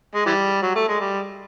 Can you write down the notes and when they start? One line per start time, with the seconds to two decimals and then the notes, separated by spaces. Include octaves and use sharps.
0.15 G#3
0.26 E3 G3
0.62 F#3
0.75 A3
0.88 G#3
1.00 G3